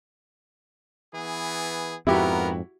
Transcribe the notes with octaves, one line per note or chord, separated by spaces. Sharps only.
E3 B3 G#4
F2 G#2 B3 E4 F#4 G4 A#4